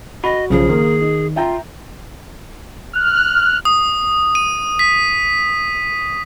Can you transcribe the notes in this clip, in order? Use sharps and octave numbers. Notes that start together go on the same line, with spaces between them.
F#4 D#5 B5
B1 C#3 F3 G#4
D#3 A#3
D#4
F4 E5 G5 A#5
F6 F#6
D#6
D#7
B6